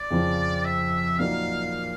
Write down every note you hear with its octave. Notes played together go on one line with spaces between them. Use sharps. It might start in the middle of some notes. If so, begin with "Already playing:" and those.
Already playing: D5
F2 C#3 F3
E5
A#2 F#3 A#3 D#4 F5